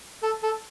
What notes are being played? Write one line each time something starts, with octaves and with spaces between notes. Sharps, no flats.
A4
A4